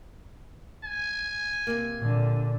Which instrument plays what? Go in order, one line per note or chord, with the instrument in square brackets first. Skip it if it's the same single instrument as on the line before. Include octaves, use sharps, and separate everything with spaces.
[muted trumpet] G#5
[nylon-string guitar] C3 A#3
[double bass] A#2 D3